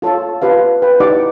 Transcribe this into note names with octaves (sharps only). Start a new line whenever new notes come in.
F4 A4 C#5 F5 A5
F4 G4 B4 F5
B4 G5
D#4 E4 G4 D5 F#5 D6